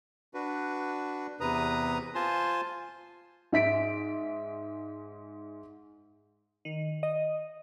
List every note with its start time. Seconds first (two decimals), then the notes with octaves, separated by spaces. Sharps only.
0.34 D4 F#4 B4
1.41 E2 C3 B4 A#5 D#6
2.15 F4 C5 G#5 A5 C6
3.53 G#2 E5 B6 D7
6.65 D#3
7.03 D#5